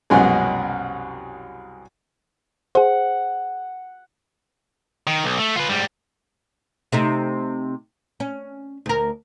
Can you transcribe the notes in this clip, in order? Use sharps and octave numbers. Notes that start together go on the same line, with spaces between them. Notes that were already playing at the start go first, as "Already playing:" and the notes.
C2 F#2 B2 G#3 C#4 G#4
G#4 C5 F#5
D#3
B1
A3
F4 B4
G#2 G3
C3 A3 D#4
C#4
D2 A#4